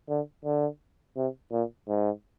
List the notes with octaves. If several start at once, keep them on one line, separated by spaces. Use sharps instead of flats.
D3
D3
C3
A#2
G#2